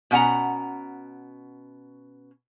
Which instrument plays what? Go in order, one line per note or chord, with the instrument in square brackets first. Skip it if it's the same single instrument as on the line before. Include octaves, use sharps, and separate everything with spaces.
[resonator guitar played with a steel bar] B2 C#4 F#5 A5 A#5